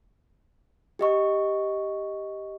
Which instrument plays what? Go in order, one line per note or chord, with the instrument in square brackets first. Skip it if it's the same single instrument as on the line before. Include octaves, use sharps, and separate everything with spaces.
[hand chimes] G4 D#5 C#6